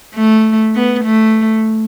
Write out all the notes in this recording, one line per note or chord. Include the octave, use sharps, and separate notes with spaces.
A3
B3
A3